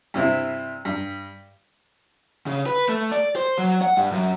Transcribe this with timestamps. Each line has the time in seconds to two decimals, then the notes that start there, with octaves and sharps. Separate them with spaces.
0.14 G2 C3 C4 E4
0.85 G2
2.46 C#3
2.66 B4
2.89 A3
3.12 D5
3.36 C5
3.58 F#3
3.82 F#5
3.97 G2
4.12 F#2